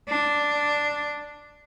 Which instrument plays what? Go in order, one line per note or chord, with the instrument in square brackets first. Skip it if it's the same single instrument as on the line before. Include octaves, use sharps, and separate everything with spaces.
[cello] D4